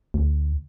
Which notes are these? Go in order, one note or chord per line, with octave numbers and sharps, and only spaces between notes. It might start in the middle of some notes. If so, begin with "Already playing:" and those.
D2